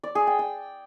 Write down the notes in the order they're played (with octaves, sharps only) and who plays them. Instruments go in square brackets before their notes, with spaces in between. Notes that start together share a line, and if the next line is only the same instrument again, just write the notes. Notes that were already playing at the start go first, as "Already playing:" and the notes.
[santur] D5
G#4
G5
G5